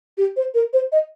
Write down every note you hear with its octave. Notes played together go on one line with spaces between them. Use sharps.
G4
C5
A#4
C5
D#5